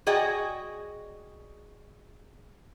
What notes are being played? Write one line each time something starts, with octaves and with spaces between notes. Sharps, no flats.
F#4 G#4 D5 D#5 G5